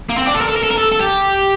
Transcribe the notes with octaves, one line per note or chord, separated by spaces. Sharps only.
A#3
C4
D4
A4
A#4
A4
A#4
A4
A#4
A4
A4
G4